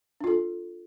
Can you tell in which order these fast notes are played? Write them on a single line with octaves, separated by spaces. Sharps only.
D4 F4 A4